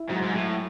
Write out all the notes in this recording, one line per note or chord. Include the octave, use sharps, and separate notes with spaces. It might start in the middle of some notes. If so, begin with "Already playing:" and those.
Already playing: E4
G#2 F#3
G#2
A2 F#3